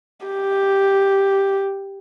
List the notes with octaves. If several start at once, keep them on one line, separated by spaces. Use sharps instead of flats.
G4